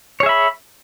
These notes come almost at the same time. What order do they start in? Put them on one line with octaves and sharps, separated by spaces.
C#5 G#4 E5 B5